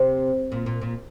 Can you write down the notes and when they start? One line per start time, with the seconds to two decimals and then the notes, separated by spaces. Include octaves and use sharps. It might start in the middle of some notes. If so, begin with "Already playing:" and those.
Already playing: C3
0.52 A#2
0.66 A#2
0.81 A#2